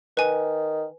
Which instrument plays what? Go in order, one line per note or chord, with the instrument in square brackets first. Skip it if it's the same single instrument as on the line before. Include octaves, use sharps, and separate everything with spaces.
[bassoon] D#3 [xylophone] B4 G#5